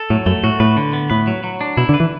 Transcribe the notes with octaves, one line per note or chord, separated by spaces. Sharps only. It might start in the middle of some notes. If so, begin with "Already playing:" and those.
Already playing: A4
A2 F#3
F#2 A3
A2 F#4
A2 B4
D3
B3
A2 B4
F#3
F#3
D4
B2 E4
D3
B4
E3